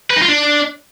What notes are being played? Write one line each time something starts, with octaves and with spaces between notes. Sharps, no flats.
B4
D#4
F4
D4